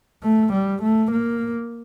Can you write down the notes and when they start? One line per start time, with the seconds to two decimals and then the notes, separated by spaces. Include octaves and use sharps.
0.23 A3
0.53 G3
0.82 A3
1.12 A#3